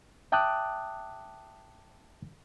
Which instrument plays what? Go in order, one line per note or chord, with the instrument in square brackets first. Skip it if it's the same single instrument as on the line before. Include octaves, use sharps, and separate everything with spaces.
[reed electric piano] E5 G5 A5 D6 D#6 F#6